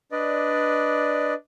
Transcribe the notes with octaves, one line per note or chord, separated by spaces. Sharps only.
D4 B4 D5 D#5